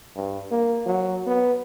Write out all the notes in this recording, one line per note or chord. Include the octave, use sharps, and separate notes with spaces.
G2
A#3
F#3
B3